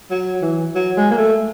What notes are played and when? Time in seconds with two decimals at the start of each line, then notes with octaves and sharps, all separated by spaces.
0.11 F#3
0.42 E3
0.75 F#3
0.97 G#3
1.10 A#3
1.18 A3